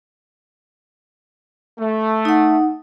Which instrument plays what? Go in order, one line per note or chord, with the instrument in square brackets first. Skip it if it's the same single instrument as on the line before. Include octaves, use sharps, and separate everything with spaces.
[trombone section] A3
[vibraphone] D#4 F#5